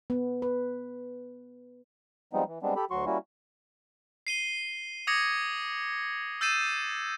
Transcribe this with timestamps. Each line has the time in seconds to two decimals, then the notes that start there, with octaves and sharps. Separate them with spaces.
0.10 B3
0.42 B4
2.33 F3 G3 G#3 B3 C4 D#4
2.48 E3
2.62 G3 G#3 B3 C4 D4
2.76 G4 A4 B5
2.91 D2 F#3 F#4 C6 C#6
3.06 G3 A#3 C#4 E4 F#4
4.27 C7 D#7 G7
5.07 D6 D#6 G#6 A#6 C#7
6.41 E6 G6 A6 C7 D#7 E7